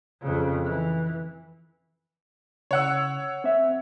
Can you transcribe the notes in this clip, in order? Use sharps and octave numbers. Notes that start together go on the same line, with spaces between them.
F2 C#3
E3
C#3 C#5 F#5 E6
C4 E5